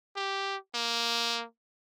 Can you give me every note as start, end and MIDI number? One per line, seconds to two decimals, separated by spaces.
0.16 0.57 67
0.75 1.44 58